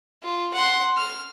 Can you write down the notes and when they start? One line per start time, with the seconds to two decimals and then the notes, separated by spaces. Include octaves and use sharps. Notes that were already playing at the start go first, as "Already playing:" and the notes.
0.23 F4
0.54 F#5 C6
0.97 F6